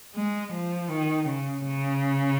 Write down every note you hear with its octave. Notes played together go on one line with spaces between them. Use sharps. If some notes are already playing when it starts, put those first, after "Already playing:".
G#3
F3
D#3
C#3
C#3